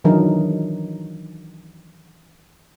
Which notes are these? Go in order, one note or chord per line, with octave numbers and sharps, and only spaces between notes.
D#3 E3 F#3 D4 D#4 A#4